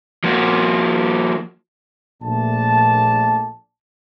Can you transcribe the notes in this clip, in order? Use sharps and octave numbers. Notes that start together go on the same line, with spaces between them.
F3 A#3 F#4
A#1 A#2 A3 D5 A5